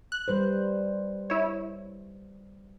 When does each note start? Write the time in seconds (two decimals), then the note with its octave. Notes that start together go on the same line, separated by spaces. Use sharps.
0.12 F#6
0.28 G3 B4 C5
1.30 E4 C#5